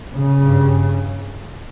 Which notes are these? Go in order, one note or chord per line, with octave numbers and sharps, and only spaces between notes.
C#3
G2